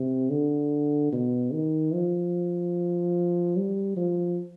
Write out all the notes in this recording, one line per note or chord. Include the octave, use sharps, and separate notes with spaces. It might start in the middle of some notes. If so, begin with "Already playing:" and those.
Already playing: C3
D3
B2
D#3
F3
G3
F3